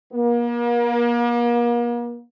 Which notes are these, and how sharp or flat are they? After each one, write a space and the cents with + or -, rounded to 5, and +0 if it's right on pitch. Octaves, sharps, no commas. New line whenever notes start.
A#3 +40